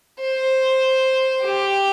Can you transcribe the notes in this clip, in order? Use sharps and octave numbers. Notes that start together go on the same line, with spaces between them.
C5
G4